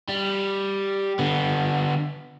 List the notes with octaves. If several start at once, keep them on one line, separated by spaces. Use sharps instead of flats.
G3
D3 B3